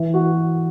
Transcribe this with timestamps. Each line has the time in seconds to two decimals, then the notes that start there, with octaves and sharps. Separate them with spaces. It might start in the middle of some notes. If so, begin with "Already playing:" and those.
Already playing: E3
0.14 F#4